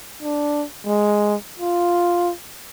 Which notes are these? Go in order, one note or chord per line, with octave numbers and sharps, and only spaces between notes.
D4
G#3
F4